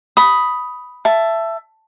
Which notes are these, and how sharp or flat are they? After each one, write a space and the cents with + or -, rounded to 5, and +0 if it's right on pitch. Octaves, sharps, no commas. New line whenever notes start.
B5 +0 D#6 +10
E5 +15 A5 +0